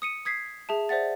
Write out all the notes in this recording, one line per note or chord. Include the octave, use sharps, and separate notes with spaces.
D#6 C#7 D#7
D#6 G#6 B6 C7
G#4 E5 A5
C5 D5 E5 F#5 A6